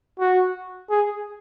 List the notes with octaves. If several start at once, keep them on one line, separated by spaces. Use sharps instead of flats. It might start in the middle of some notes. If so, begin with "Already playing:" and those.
F#4
G#4